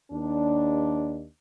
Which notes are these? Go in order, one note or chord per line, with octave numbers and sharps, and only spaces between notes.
D#2 D4